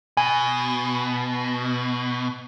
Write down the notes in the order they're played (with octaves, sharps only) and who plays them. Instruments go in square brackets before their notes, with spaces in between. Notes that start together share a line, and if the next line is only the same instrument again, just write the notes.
[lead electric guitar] B2 [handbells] G#5